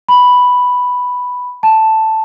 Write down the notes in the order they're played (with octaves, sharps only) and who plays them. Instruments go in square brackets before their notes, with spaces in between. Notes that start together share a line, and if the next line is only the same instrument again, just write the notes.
[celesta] B5
A5